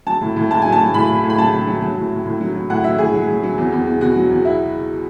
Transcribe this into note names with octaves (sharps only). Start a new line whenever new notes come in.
F#3 A5
A2
A2
A2 A5
F#3 G#5
A5
F#3
A2 B5
A2
A2
B5
F#3 A5
F#3
F#3
F#3
A2
A2
A2
F#3
F#3
A2 F#5
F#3 E5
A2 G#4
F#3
F#3
F#3
E2
E2
E2
B2 F#4
F#3
E2
E4